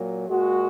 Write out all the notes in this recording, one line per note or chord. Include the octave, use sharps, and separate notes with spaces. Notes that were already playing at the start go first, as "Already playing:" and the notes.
Already playing: A#2 F#3
A#2 G#3 F#4